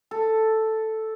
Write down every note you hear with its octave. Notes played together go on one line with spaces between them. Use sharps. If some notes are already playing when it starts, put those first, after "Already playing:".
A4